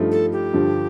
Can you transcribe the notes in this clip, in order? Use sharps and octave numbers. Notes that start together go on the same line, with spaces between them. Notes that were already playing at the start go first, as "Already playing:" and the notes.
Already playing: G2 F3 A3 D#4
A4
G4
G2 D3 F3